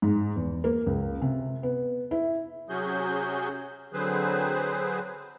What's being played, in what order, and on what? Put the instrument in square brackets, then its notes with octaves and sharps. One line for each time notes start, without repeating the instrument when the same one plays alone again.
[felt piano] G#2
E2
A#3
C#2
C3
B3
E4
[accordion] C3 F#3 C#4 F#4 G#4 G6
D3 F#3 C4 G#4 B4 C5